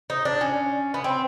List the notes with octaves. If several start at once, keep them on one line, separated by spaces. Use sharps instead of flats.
D#4
D4
C#4
B3
C4